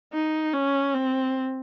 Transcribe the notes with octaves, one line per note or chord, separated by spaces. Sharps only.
D#4
C#4
C4